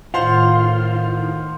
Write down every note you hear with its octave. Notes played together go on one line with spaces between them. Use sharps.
A2 D#3 F4 C5 F5 F#5